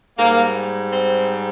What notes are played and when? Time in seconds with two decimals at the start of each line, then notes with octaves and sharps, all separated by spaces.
0.18 G#2 G3 A#3
0.90 C4